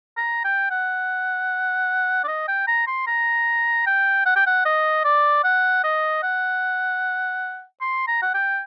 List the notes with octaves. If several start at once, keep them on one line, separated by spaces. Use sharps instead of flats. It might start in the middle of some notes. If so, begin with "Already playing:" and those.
A#5
G5
F#5
D5
D#5
G5
A#5
C6
A#5
G5
F#5
G5
F#5
D#5
D5
F#5
D#5
F#5
C6
A#5
F#5
G5